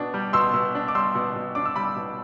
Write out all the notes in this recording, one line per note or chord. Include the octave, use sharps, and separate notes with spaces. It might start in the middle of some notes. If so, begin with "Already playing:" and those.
Already playing: B2 D4
G3
B2 C6 E6
B2
D4
D6
G3 C6 E6
B2
B2
D4 D6
E6
G3 B5 D6
B2